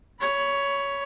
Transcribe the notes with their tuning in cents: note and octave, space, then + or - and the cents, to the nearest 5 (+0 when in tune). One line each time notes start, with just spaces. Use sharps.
C#5 +10 B5 +0